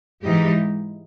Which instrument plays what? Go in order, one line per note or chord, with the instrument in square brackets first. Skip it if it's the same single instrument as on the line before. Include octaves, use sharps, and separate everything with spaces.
[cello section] G#2 E3 G#3 D#4 G4